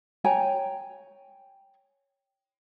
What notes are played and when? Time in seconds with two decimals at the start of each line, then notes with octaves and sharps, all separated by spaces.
0.24 C#5 G5 G#5 A#5